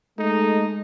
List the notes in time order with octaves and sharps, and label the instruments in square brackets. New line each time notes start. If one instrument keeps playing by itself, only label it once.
[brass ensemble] G#3 [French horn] A3 [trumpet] D#4